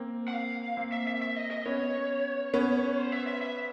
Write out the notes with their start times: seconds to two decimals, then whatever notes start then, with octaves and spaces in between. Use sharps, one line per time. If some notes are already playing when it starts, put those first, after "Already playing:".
Already playing: A#3 C4
0.28 F#5
0.33 F5
0.77 A#3 C4
0.92 E5
1.07 E5
1.22 E5
1.36 D#5
1.51 D#5
1.65 B3 C#4 C#5
2.54 B3 C#4
2.98 C5
3.12 E5
3.27 E5
3.42 E5